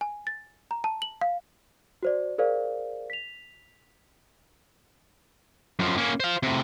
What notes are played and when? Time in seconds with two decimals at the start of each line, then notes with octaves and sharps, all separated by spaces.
0.01 G#5
0.27 A6
0.71 A#5
0.84 A5
1.02 F#7
1.21 F5
2.03 F#4 C5 D5
2.38 G#4 A#4 C5 D5 F5
3.10 B6 F7
5.79 F#2 F3
5.98 A#3 C#4
6.20 C5 F5
6.43 A2 C3